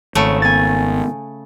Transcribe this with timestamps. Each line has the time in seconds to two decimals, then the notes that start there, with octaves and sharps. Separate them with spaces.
0.15 G#1 C#3 A3 C#5
0.42 B3 G#5 A6